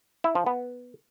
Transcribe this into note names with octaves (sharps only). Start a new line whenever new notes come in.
E4
F3
B3